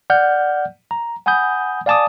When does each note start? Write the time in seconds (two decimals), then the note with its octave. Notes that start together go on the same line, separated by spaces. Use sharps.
0.10 D5 F#5 F6 G6
0.91 A#5
1.26 F#5 G#5 B5 D#6 G6
1.86 D5 F5 G#5 A5 D6 D#6